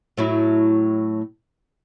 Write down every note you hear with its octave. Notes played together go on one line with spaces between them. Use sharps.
A2 F#3 E4